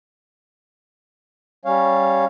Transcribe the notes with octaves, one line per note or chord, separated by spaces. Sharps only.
G3 C#4 C#5 F5